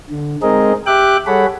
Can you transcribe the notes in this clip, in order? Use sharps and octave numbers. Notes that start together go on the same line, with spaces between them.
D3
G#3 C4 D#4 G#4 A#4 D#5
G4 E5 G5 D6 F#6
G3 G#4 A4 C#5 F#5 B5